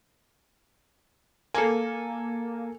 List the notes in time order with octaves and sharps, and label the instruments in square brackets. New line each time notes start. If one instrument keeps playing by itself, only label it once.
[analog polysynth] A#3 [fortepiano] A4 G#5